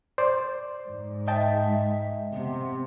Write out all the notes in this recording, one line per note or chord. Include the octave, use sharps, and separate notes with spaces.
C5 D5
G#2
D#5 E5 G5 A5
C3 B3